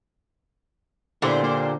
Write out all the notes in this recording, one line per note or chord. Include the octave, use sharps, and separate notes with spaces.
A#2 D3 G3 B3 E4 C5
A#3 D4 C5